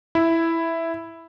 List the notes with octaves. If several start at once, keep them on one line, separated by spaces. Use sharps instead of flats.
E4